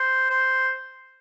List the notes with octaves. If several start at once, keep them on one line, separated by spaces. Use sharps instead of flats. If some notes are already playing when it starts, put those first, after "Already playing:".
Already playing: C5
C5